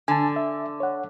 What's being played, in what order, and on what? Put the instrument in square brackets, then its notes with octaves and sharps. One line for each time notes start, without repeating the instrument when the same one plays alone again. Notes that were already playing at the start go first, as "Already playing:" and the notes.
[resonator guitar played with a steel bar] D3 [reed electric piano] G#5 A5
[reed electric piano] E5
C#5 F#5